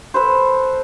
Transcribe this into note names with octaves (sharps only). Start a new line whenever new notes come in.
A4 B4 C5